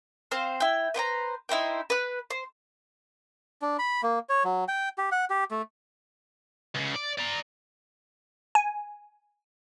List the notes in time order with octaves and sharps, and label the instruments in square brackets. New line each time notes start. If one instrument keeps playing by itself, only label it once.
[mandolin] C4 C5 F5 C6
E4 G5
B4 C5 G5 A#5
D#4 E4 C5 G5
B4 F#6
C5
[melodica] D4
B5
A#3
C#5
F#3
G5
G4
F#5
G4
A3
[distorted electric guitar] C#2 C#3
D5
D5 A#5
[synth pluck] G#5